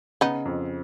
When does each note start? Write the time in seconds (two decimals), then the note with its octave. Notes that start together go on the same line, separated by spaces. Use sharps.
0.21 C#3 B3 D#4
0.45 F2